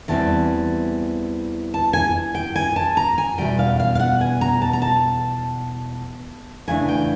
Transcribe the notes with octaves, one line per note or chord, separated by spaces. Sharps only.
E2 C3 E3 G3 C4 A5
A5
G#5
G5
G#5
A5
A#5
G#5
E2 B2 G3 A#3 G5
F5
F5
F5
F#5
G#5
A#5
A5
A#5
A5
C#3 E3 A3 D4 G#5
G5